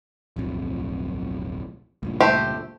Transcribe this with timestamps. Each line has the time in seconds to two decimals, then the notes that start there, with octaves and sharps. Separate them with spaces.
0.36 D1 B1 F2
2.03 C#2 G2 A#2
2.21 A3 G4 C5